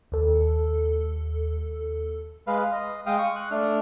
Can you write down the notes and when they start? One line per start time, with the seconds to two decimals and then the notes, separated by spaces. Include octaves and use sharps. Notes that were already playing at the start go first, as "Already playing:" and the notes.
0.12 D#2 A4
2.47 G#3 B4 F5
2.72 D#5
3.06 G#3 F5 G5 D#6
3.18 C#6
3.36 F#6
3.51 A3 D4 F6